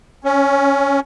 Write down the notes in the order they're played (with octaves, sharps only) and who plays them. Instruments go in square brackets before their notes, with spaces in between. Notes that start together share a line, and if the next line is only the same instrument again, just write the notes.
[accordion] C#4